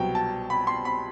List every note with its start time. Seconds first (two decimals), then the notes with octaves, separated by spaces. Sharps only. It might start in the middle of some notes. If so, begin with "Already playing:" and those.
Already playing: C2 B2 F#3 G5
0.15 A5
0.50 B5
0.67 C6
0.85 B5